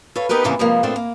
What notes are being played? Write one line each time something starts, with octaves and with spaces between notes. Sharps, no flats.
A4 B4 C#5 F5
B3 D#4 G4 A#4 B4
C3 D#3 E3 A#3 B3 C#4
C3 F3 G3 G#3 A#3
A#2 A3 B3 C4 D4 F4
A#3